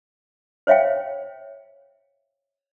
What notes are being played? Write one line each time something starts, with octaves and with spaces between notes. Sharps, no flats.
C5 C#5 E5 F5 G5